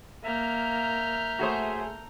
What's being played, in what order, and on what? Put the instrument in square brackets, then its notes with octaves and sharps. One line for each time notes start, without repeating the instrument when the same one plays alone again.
[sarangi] A#3 [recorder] E5 [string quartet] A#5 F6 G6
[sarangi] A3 [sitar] F#4 G#4 C5